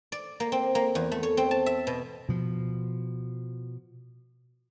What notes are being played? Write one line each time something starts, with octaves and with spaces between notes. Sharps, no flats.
D5
A#3
C4
A#3
E2
A3
C#5
C4
A5
E5
B2
B2 F3